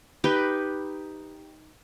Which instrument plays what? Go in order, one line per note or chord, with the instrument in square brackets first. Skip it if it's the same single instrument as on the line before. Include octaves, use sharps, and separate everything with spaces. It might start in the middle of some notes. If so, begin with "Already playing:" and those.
[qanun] D#4 G4 B4